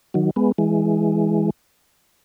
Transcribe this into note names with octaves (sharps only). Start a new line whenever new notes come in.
D#3 F#3
G#3 B3
E3 G#3